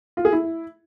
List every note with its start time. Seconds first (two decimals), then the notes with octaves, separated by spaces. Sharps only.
0.17 F4
0.25 G#4
0.33 E4